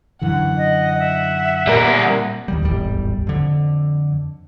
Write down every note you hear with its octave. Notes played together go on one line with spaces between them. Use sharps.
F#2 D3 E3 F#5
D#5
E5
A#2 G3 A#4
D#2 D#3 G3
D1 G#1 E2 G3
F2 D3